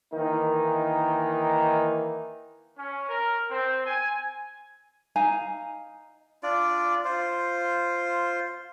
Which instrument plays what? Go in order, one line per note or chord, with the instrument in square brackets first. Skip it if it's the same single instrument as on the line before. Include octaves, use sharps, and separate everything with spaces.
[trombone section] D#3 E3 A#3 D#4
[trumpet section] C#4
A#4
C4
G#5
[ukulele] D#4 F5 G#5 A#5
[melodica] D4 F4 D5
F4 C5